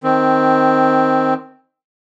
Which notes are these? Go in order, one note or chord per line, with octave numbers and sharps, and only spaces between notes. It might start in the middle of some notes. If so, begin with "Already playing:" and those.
D#3 C4